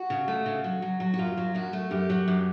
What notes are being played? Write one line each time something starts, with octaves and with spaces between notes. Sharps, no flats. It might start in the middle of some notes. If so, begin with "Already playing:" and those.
Already playing: F#4
C#3
A3
C#3
F#3
F#3
F#3
F#4
F#2 F4
F#3
F#2 F#4
A3
F#2 G4
F#3
F#2